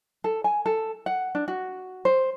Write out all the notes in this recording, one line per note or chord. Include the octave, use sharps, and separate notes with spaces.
A4
G#5
A4
F#5
D4
F#4
C5